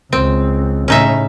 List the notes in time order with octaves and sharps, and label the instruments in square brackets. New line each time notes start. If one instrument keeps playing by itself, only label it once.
[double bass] C#2 [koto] C4
[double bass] A2 C#3 [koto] C#4 D#4 E5